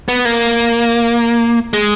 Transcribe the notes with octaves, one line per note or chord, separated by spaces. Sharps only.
B3
A#3
G#3